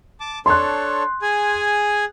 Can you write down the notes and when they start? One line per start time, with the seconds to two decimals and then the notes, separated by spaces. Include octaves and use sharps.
0.20 A5 D6
0.46 D4 A4 C#5 C6 F#6
1.22 G#4 G#5